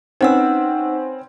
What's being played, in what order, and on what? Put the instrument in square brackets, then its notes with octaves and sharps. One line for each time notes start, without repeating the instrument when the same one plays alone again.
[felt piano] C4 C#4 B4 [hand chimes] D#4 F#5 E6